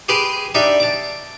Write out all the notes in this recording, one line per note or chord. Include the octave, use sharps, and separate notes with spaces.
G4 G#4 B4 C6 D6
D4 D#4 G4 E5
A5 D6